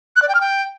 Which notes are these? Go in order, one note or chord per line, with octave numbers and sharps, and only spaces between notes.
F#6
D5
G5
F6
G5